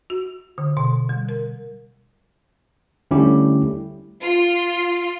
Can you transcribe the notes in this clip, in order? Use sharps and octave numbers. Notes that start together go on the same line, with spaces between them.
F#4
D3
B2
G3
A#4
D3 G3 A3 C#4 E4 G4
F4